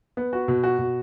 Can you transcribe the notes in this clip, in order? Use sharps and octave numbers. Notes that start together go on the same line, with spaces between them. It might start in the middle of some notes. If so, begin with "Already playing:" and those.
B3
F#4
B2
F#4
B2